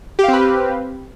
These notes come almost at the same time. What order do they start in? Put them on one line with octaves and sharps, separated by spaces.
G4 F5 C4 B4